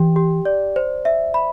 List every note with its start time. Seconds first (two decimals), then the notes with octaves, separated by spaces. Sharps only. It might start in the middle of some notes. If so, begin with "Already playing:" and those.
Already playing: E3 G4 G5
0.16 G4
0.45 D5
0.76 C5
1.05 E5
1.34 B5